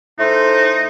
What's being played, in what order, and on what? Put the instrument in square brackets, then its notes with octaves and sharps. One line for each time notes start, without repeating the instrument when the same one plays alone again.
[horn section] A2 E4 C5 [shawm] D#4